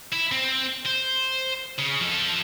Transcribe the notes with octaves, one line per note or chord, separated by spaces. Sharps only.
E4
C4
C5
C#3
F3 A4